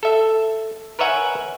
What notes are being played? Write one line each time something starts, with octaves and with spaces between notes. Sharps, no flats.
A4 E5
A#4 B4 C#5 E5 F#5 G#5